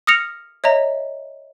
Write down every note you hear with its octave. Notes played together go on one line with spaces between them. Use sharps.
D#6 F6 A#6 C#7 F7
C#5 D#5 E5 A#5